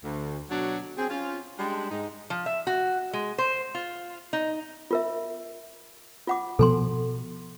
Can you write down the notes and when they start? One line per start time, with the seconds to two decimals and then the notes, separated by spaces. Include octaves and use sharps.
0.04 D2
0.50 B2 F#3 D4 C#5 F#5
0.97 C4 G#4
1.10 C#4 F4
1.58 G3 G#3 D4
1.90 G#2 D#4
2.30 F3
2.46 E5
2.67 F#4
3.13 G#3
3.38 C5
3.75 F4
4.33 D#4
4.91 F4 A#4 E5
6.27 F4 F#5 D6
6.59 B2 F3 B3 A4 G#5 C6